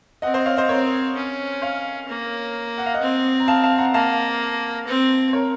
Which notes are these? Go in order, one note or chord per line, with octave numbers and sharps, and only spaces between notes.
C4 D#5 F#5
C5 D#5
C#5 F5
C5 D#5
C4 A#4 C#5
C#4
C#5 F5
A#3
F#5
F5
D#5 F#5
C4
A#5
F5 A5
F5 A5
F#5 A#5
A#3 F5 A5
C4
A#4 C#5